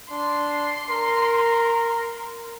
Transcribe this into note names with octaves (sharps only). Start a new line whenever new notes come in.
D4 C6
A#4